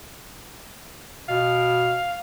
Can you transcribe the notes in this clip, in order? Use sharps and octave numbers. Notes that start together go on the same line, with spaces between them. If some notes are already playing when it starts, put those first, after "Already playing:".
B2 F5